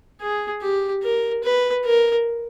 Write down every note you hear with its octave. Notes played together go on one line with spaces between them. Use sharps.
G#4
G4
A#4
B4
A#4